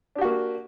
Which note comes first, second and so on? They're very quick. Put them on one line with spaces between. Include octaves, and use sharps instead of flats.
D4 G4 F#4 A#3